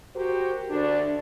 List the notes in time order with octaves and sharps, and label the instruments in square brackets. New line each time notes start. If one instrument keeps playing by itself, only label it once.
[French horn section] F#4 G4 A#4 C5
D2 D4